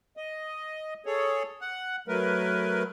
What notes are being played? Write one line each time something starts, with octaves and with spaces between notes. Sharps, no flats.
D#5
G#4 A4 C#5
F#5
F#3 A3 A#4 B4